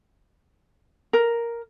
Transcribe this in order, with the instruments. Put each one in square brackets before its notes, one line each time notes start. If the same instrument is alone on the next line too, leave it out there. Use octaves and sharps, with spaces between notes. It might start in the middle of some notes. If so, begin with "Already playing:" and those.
[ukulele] A#4